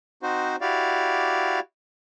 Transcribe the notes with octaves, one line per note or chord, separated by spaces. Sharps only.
C4 D#4 F#4 C5
E4 F#4 G4 D5 F5